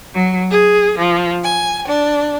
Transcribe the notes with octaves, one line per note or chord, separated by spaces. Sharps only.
F#3
G#4
F3
G#5
D4